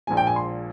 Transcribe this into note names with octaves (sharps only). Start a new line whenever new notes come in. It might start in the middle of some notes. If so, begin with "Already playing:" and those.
A#1 A#2 F3 G#3 G#5
G5
G#5
C6